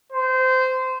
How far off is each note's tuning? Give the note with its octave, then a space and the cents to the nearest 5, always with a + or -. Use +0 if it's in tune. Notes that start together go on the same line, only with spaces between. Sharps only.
C5 -20